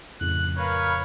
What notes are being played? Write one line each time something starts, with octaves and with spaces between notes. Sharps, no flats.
F2 A2 C#3 F#6
A#4 B4 C#5 F5 B5